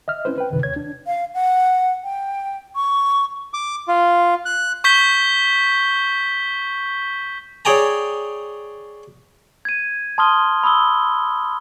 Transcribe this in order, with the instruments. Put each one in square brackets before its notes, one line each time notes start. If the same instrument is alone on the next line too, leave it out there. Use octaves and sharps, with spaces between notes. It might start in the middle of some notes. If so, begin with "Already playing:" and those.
[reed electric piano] D#5 E5 F6
C4 C#4 E4 B4 C5
B4 G5
C#2 F#2 C3 D#3 B4
D#2 C#5 G#6
D4
[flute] F5
F#5
G5
C#6
[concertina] D6
F4
F#6
[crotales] C#6 G6 B6 G7
[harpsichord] G#4 C#5 D5 G5 G#5 A#5
[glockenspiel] G#6 D#7
A5 C6 D#6 F6 G7
B5 D#6 E6 G7